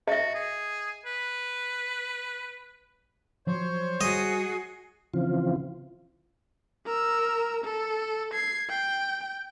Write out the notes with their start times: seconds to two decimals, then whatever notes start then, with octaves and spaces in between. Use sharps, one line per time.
0.08 F#4 D#5 E5
0.34 G#4
1.05 B4
3.47 F3 F#3 C5 C#5
4.01 G3 F#4 G#4 D#5
5.14 C#3 E3 F3 C4 F4
6.86 A#4 E6
7.65 A4
8.33 G#6 C7
8.69 G5